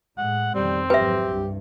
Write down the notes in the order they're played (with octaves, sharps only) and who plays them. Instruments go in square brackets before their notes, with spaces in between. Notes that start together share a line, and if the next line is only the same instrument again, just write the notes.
[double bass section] A2 G#3 [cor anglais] F#5
[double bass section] F2 B2 D#3 [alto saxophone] G3 [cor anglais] C4
[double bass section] G#1 F2 F#3 [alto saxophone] G4 [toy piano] B4 E5
[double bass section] C2 G2